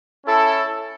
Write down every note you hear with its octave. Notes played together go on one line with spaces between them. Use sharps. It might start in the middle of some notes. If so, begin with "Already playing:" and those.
C#4 E4 A4